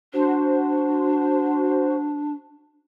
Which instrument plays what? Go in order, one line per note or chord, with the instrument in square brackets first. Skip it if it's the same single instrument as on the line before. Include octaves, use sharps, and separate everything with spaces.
[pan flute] D4 [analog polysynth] F#4 C5